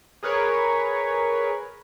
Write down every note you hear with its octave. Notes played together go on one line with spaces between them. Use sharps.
G#4 A#4 B4 C#5